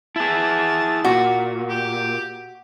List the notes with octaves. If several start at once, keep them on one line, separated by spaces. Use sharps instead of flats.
E4 G#4 A5
A#2 F#4
G4